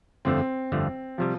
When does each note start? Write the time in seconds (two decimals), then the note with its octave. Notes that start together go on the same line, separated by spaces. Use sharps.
0.25 G1 F2 D3 A3 C4
0.72 G1 F2 D3 A3
1.18 C3 F3 G3